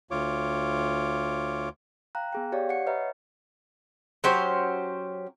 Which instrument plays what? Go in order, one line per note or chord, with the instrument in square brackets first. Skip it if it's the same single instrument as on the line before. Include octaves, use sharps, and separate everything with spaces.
[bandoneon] D2 F4 C#5 D6
[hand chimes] F5 G5 A#5 F#6
B3 G#4 G5
G4 C#5 D5 F5
F#5 C#7
B4 C#5 D#5 E5 A#5
[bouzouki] F#3 C#4 G4 C5